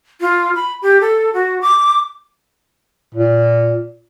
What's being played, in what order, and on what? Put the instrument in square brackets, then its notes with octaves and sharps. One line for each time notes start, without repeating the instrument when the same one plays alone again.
[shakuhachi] F4
B5
G4
A4
F#4
D6
[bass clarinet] A#2